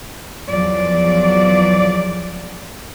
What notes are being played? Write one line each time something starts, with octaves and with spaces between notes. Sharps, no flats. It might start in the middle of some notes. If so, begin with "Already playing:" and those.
E2 F3 F#3 D5